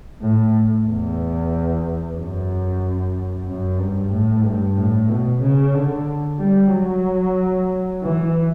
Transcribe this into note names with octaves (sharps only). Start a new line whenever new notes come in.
A2
E2
F#2
F#2
G2
A2
G2
A2
B2
C#3
D3
G3
F#3
E3